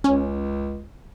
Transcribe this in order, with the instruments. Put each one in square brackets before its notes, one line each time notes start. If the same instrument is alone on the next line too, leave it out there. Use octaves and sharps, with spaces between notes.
[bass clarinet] C#2 [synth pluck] C#4